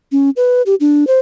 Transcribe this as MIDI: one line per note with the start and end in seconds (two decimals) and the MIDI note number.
0.12 0.30 61
0.37 0.62 71
0.66 0.75 67
0.80 1.07 62
1.07 1.20 72